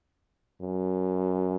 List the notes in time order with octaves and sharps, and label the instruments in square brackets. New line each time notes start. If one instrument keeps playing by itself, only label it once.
[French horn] F#2